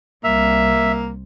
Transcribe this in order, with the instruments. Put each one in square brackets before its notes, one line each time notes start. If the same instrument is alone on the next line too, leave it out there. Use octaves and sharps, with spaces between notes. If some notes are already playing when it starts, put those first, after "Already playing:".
[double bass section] C2 G3 C4 [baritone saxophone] A#3 [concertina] E5